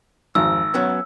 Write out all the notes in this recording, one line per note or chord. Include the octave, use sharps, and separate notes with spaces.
G#1 F2 E6
F#3 B3 C#4